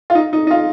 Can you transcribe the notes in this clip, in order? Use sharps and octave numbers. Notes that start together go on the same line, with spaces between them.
F4
D#4
D#4
D#4
F4